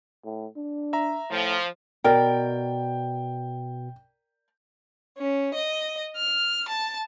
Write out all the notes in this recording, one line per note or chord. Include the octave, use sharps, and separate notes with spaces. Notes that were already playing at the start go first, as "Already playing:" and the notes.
A2
D4
E5 A#5
A2 F3
B2 A#4 D5 G5
C#4
D#5
F6
A5